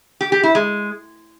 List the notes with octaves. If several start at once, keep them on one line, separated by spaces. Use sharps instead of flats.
G4
G4
E4
G#3